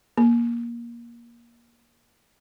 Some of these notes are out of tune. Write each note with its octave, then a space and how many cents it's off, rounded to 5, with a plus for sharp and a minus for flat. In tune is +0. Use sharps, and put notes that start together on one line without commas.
A#3 +20